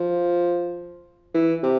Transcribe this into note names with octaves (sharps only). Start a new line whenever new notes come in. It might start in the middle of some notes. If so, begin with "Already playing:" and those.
Already playing: F3
E3
C3